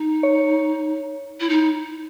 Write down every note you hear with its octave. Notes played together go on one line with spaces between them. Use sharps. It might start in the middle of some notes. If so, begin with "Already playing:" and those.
Already playing: D#4
C#5
E4
D#4